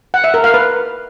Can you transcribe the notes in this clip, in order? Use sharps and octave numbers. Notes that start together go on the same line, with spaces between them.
F#5
E5
A#4
F5
B4